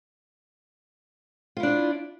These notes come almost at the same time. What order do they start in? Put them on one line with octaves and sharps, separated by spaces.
F4 E4 D4